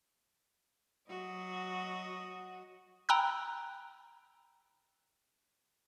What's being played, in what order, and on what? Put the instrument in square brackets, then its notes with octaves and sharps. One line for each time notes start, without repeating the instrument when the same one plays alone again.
[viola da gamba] F#3 F#4 D#5
[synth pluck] G5 A#5 B5 E6 F#6